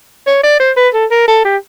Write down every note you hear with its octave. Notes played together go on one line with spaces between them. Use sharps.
C#5
D5
C5
B4
A4
A#4
A4
G4